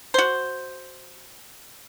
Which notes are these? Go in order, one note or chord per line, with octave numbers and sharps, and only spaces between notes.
F#4 C5